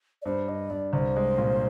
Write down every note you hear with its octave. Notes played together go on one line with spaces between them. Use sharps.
D5
G2 C5
G2 D#5
G2 D5
C2 C5
G#3
A#2